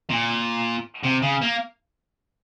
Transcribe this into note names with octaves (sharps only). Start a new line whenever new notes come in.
A#2
C3
C#3
A#3